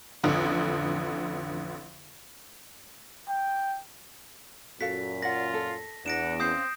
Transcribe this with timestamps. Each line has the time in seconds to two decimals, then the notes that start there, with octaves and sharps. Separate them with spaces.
0.23 A1 F2 D3
3.28 G5
4.81 F#2 A#2 F#4 A4 F5 B6
5.22 F4 D5 F#5 A#6
5.54 A4
6.06 E2 D4 F#5 A#6 D7 E7
6.40 C4 C#4 C5 F5 D#6 G6 C7